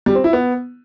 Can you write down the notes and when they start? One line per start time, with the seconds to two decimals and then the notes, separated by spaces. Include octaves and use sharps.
0.06 G3
0.15 C4
0.24 E4
0.33 B3